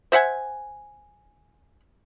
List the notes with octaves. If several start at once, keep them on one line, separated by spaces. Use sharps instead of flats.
C5 E5 F#5 G#5